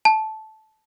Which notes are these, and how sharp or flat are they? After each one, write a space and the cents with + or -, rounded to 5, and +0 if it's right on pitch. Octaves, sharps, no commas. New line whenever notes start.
A5 -10